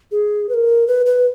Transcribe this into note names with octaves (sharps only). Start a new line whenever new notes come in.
G#4
B4
A#4
B4
B4